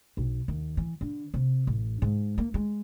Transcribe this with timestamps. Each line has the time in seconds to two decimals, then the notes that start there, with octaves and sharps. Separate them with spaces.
0.17 B1
0.48 D#2
0.77 E3
1.01 D3
1.34 C3
1.67 A1
2.02 G#2
2.38 A#3
2.54 G#3